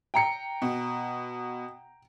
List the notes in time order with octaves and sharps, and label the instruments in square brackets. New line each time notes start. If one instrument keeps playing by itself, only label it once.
[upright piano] G5 A#5 C#7
[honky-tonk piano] B2